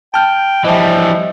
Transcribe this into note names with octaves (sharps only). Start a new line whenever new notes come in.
G5 A5 F6 G6
E3 F3 G3 D#5 E5